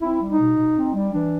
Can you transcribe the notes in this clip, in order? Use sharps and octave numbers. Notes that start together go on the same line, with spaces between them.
C4 E4
G3
D#4
B2
B2
C4
G3
E3 D4